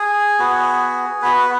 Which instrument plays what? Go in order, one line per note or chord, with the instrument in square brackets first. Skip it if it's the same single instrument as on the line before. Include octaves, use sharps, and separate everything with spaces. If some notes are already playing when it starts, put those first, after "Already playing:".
Already playing: [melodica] G#4
B3 F#4
B3 F#4 B4